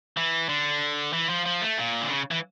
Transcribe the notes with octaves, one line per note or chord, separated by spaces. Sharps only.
E3
D3
E3
F3
F3
A3
A#2
D3
C#3
E3